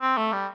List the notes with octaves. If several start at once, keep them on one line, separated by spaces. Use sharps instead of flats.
C4
A3
G3